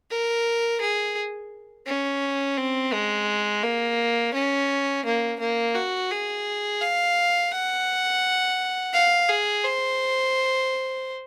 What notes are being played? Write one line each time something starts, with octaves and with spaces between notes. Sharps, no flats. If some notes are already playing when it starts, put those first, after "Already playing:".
A#4
G#4
C#4
C4
G#3
A#3
C#4
A#3
A#3
F#4
G#4
F5
F#5
F5
G#4
C5